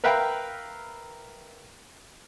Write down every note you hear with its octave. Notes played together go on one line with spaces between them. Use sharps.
A#4 B4 E5 F5 G5 B5